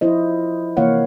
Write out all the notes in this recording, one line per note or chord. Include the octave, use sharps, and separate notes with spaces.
F3 E4 C5 D#5
C3 E3 A#3 C#5 F5 F#5